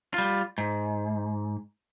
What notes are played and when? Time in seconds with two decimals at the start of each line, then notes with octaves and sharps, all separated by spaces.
0.14 G3 F4
0.58 G#2